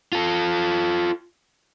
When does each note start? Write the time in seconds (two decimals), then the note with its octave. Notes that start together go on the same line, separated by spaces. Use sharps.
0.12 F4 A4